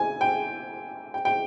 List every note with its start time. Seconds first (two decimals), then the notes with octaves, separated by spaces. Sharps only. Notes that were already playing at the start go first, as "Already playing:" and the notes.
Already playing: G#5
0.21 G5
1.14 G5
1.25 G5